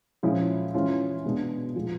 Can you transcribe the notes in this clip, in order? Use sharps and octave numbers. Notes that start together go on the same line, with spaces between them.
A#2 F3 G#3 C#4 E4
E3 G#3 C#4 F4
B2 G#3 B3 D4
A#2 F3 G#3 B3